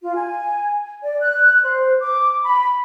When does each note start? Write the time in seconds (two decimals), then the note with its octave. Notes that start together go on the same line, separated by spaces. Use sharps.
0.02 F4
0.15 G#5
1.03 D5
1.20 F#6
1.64 C5
2.00 D6
2.44 B5